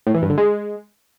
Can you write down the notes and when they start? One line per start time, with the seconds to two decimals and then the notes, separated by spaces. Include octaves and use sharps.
0.07 A2
0.14 E3
0.22 G2
0.30 D3
0.38 G#3